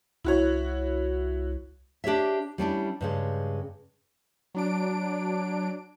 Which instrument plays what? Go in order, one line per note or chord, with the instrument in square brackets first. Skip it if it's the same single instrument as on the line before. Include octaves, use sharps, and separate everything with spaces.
[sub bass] C2 [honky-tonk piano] E4 F#4 C#5
[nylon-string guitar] D4 G4 G#4 C#5 E5
G3 C#4 D4 E4
G2 C#3 G#3
[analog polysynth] F#3 D4 D7